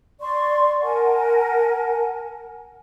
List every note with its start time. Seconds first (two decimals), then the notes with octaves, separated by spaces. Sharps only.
0.21 D5 C6 C#6
0.82 A#4 F#5 G#5 A5